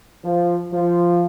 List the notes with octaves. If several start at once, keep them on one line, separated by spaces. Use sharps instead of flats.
F3
F3